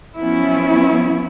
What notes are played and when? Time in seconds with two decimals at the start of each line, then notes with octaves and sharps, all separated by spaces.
0.17 F3 F#3 B3 C#4 E4